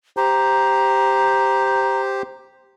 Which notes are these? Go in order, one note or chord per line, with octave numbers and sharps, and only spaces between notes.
G4 C5 A#5